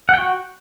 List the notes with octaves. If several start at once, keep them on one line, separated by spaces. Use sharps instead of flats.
F#4 F#5 G5